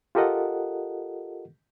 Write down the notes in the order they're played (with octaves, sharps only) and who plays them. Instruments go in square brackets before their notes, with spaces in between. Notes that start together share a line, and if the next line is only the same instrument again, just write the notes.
[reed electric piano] F4 G4 A4 A#4 D#5 F#5